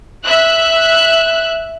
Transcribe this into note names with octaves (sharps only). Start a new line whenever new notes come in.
E5 F#6